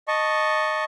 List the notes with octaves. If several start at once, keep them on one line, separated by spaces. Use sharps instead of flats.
D#5 A5 C#6